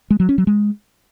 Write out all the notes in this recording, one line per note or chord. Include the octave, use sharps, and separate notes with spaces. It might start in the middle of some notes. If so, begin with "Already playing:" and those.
G#3
F#3
C#4
F#3
G#3